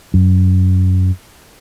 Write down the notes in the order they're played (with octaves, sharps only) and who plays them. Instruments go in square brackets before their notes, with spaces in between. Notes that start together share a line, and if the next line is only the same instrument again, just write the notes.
[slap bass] F#2